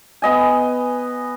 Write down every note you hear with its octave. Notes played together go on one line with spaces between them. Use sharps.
B3 D#5 G#5